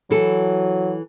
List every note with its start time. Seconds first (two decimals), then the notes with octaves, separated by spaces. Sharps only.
0.10 E3 F#3 A4